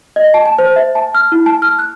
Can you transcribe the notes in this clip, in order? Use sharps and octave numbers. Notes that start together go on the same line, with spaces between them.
D#5
A5
A5
C5
E5
A5
F6
E4
A5
F6
F#6